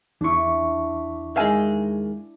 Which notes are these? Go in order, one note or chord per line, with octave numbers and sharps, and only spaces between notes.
E2 D4 E4 C#6
D#3 G#3 E5 F5 G#5